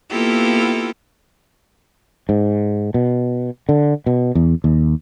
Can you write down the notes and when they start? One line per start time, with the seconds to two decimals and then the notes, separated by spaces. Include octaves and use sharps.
0.11 A#3 B3 E4 F4 G4 A4
2.29 G#2
2.94 B2
3.69 D3
4.06 B2
4.35 E2
4.64 D#2